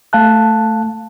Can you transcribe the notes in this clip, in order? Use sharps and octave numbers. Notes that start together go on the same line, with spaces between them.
A3 F5 A5 F#6